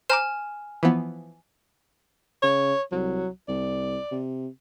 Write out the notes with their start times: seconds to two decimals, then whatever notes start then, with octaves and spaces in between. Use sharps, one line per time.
0.10 C5 G#5 A#5 D6 F6 E7
0.83 E3 F3 B3
2.43 C#3 C#5
2.92 C2 F#3
3.48 C2 D5
4.12 C3